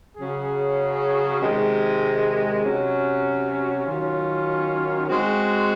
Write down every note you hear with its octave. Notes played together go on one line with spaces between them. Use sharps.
C#3 F#3 C#4 G#4
C3 D#3 G#3
C3 F#3 C#4
D#3 F#3 C#4 F4
G#3 C4 F#4